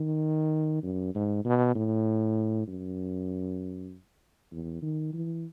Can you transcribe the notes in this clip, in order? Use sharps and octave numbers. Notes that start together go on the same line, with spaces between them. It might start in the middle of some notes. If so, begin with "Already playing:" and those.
Already playing: D#3
F#2
G#2
B2
A2
F#2
E2
D#3
E3